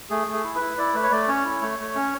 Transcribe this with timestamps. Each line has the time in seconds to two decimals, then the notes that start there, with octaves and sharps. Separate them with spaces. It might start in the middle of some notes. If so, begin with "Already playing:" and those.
0.10 A3 G#4
0.27 A3
0.33 G#4
0.44 E4
0.56 B4
0.61 E4
0.78 E4 D5
0.94 A3 B4
1.03 C#5
1.11 A3 D5
1.28 C#4 C#5
1.45 E4
1.62 A3
1.79 A3
1.95 C#4